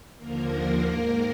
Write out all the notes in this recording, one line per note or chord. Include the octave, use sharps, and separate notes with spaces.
D#2 D3 F3 A#3 A#4
G#2 D#3 A#3 A#4